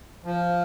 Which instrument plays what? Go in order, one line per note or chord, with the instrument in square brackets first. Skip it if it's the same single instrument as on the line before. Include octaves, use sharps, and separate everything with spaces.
[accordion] F3